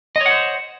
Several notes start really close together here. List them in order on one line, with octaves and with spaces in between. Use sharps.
D#5 C#5 F#5 C5